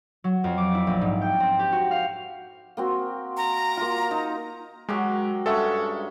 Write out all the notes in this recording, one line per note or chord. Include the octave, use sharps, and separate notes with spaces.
F#3
F2
D6
E4
A#1
G#2
G5
C4
G4
F#4
F5
A#3 C4 F#4
A#5
A#3 F4
D#4
F#3 G#3 G4 A#4
G2 G#3 C#4 A4 E5 F#5